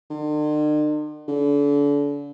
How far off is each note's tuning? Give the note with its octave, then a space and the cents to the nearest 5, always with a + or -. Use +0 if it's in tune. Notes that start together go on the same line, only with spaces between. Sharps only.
D3 +45
D3 -35